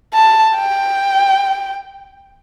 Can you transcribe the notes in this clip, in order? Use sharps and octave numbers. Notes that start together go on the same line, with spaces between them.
A5
G5